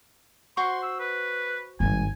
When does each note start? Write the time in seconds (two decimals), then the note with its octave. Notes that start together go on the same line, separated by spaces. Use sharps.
0.57 F#4 C5 C6 C#6
0.83 E6
1.00 B4
1.80 G#1 G2 A#2 G#5